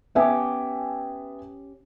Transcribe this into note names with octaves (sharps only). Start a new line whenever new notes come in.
B3 C#4 G4 E5 G#5